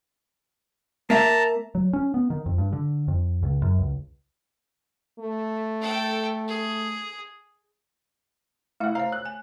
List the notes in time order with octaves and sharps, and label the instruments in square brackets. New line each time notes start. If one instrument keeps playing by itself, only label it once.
[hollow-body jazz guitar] A#3 E5 [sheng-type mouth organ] A5 A#5
[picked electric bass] F#3
C#4
B3
D#3
F2
G2
D3
F2
C#2
F#2
C#2
[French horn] A3
[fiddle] A4 G5
G#4
[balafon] A3 E5 [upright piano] E4 F#5
[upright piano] C5 F5 [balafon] C#5 A#5
[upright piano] F#6
[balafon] G#5